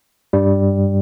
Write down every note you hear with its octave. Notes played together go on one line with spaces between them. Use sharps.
G2 G3